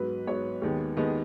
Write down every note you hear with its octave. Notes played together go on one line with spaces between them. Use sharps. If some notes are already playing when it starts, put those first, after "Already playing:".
Already playing: G#2 F#3 B3 B4
G#2 F#3 B3 C#5
D#2 D#3 G#3 B3
D#2 D#3 G#3 B3 D#5